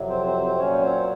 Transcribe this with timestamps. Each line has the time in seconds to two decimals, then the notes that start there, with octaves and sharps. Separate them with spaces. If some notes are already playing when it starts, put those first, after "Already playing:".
Already playing: F2 C3 F#3
0.09 C4 C5
0.26 C4 C5
0.43 C4 C5
0.59 A#2 F#3 C#4 C#5
0.82 C4 C5